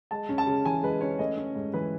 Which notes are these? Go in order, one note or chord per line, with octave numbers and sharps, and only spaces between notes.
G#3 A5
C#4
A5
C#3
E3 G#5
G#3 B4
C#4 C#5
A3 D#5
C#4
G#2
E3 B4